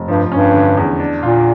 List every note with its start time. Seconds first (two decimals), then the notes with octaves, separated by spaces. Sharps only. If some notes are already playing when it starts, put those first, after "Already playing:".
Already playing: F1
0.08 G2 F3
0.31 G2 C#4
0.53 D3
0.77 E2
0.99 D4
1.23 A#2 F4